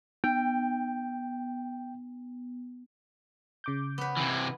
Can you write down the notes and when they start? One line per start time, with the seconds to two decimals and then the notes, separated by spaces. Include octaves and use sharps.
0.24 B3 G5
3.64 C#3 D6 G6
3.98 B3 B4
4.17 C3 E3